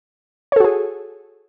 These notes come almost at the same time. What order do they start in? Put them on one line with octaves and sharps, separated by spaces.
C#5 A4 F#4 G#4